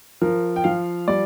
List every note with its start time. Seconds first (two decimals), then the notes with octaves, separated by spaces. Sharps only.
0.22 F3 A#4
0.56 G5
0.64 F3 F5
1.08 G3 D5